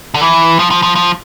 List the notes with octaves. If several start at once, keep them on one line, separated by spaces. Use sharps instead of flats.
D3
E3
F3
F3
F3
F3